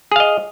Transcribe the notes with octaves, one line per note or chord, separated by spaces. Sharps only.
G#4 D#5 F5